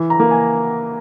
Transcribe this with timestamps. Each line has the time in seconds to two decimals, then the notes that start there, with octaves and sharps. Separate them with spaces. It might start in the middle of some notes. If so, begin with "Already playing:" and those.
Already playing: E3
0.10 A#5
0.20 A#3
0.31 G#5